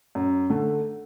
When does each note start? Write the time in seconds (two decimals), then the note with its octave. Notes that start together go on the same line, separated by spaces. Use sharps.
0.15 F#2
0.50 D3 A3